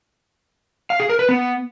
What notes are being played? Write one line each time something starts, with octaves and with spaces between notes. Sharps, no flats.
F5
G#4
A#4
B4
B3